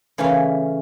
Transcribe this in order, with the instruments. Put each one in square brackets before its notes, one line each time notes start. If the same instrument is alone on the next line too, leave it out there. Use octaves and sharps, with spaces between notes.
[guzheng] C#3 E3 A3 C#4